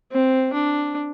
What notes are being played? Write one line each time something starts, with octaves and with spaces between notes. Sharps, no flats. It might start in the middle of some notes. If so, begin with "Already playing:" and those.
C4
D4